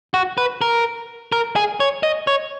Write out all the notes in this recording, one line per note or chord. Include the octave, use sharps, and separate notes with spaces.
F#4
B4
A#4
A#4
G#4
C#5
D#5
C#5